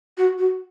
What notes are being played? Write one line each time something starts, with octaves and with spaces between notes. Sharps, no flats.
F#4
F#4